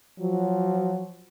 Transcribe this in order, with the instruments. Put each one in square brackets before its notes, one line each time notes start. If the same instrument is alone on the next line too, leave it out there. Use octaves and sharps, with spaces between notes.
[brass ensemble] F3 F#3